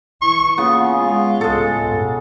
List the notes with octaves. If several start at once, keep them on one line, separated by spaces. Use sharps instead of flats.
E3 E4 C#6
C#3 A#3 B3 F4
G#3
C#2 A2 G#3 A4
G2 B2